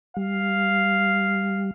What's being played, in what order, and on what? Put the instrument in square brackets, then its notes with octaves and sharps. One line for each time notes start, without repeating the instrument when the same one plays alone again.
[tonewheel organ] G3 [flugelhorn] F5